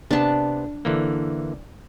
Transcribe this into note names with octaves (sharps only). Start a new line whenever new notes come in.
C3 B3 D4 A5
D3 E3 A#3